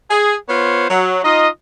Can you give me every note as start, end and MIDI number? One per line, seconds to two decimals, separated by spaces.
0.11 0.36 68
0.49 0.89 59
0.49 0.89 65
0.49 0.89 72
0.49 0.89 73
0.90 1.23 54
1.25 1.49 63
1.25 1.49 65
1.25 1.49 75